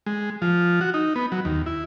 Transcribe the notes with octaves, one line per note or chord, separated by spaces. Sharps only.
G#3
F3
F#4
D#4
B3
F#3
D#2
E4